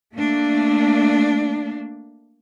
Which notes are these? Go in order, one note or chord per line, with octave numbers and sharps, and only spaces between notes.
A3 A#3 D4